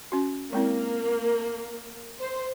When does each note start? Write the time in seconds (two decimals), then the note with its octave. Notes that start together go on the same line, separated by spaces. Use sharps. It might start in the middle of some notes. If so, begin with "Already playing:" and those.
0.12 C#4 F#4
0.53 G#3 A#3 C4 E4
2.19 C5